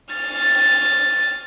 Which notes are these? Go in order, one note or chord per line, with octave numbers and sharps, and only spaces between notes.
F6 A6